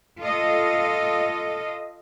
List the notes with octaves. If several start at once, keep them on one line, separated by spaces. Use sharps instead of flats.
F4 A4 D#5